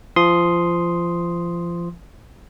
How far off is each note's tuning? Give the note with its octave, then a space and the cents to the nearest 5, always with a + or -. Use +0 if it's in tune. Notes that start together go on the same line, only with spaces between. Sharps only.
F3 -25 C6 +0 D#6 +0